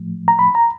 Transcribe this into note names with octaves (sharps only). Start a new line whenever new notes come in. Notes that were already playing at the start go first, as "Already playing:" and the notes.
Already playing: A2 F3 A3
A#5
B5
A#5